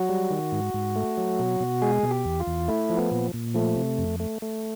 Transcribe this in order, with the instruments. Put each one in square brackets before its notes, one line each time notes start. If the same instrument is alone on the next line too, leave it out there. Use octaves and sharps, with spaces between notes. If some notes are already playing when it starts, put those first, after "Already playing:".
Already playing: [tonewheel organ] F#3 F#4
G3
D#3
G#2
G#2
A3
F#3
B2
B2
G#3 G#4
B2
G4
E2
F4
E2
A3 E4
F3
B3
A#2
A#2
F3 A3
C3
F2
A3
A3